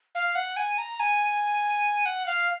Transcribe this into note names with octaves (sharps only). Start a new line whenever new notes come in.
F5
F#5
G#5
A#5
G#5
F#5
F5